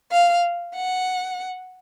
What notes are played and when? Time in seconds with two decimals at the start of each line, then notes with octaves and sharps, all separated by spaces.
0.12 F5
0.76 F#5